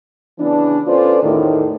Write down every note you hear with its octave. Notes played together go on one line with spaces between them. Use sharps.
C#3 E3 B3 D4
C#4 F4 A4 B4 C5 D5
E2 A2 D#3